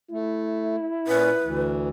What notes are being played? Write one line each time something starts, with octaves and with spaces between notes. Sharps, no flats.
A3 E4
A#2 C#4 B4
D2 E3